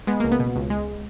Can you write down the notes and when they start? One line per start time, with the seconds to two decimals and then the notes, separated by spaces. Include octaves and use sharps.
0.07 G#3 B3
0.20 C#2 A#3
0.31 B3
0.40 B2
0.55 C#2
0.70 G#3